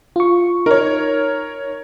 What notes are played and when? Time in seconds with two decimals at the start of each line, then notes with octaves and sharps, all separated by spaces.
0.16 F4 C#6
0.66 D#4 A#4 C#5